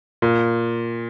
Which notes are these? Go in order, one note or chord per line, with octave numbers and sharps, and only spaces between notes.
A#2